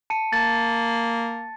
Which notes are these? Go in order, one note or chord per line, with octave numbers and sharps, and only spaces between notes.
A5 C#7 D#7
A#3 A5 A6